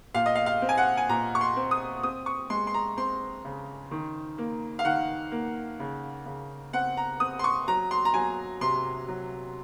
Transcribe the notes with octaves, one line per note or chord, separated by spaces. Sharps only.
A#2 F5
D#5
F5
F5
C4
G#5
F#5
G#5
A#2 A#5
C#6
C6
C4
D#6
C4 D#6
C#6
G#3 C6
C6
A#5
C4 C6
C#3
D#3
A#3
F5
D#3 F#5
A#3
C#3
C#3
C4 F#5
A#5
C4 D#6
C6
C#6
F#3 A#5
C6
A#5
F#3 G#5
C3 C6
F#3